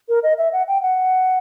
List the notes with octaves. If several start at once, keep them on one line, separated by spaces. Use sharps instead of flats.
A#4
D#5
E5
F#5
G5
F#5